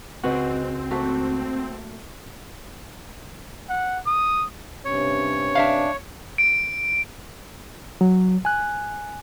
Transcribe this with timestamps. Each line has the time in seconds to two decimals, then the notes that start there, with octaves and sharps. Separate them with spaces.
0.24 C#2 G#3 C4 F#4 B4 F#5
0.91 A3 A#3 F#4
3.69 F#5
4.06 D#6
4.85 G2 C3 C#4 C#5
5.55 D4 E5 F5
6.38 D7
8.01 F#3
8.45 G#5 F#6